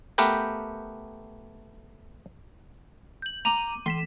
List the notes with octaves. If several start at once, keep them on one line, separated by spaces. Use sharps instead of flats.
A3 B3 G4 A#4 B4 G5
G6 F#7
A#5 D6 D#7
E3 C6 B6 E7